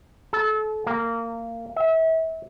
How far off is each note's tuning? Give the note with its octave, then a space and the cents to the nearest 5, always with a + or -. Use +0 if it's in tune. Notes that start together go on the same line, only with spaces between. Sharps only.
A4 -30
A#3 -20
E5 -30